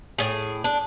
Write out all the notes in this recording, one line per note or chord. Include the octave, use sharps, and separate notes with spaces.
A2 G#4
D4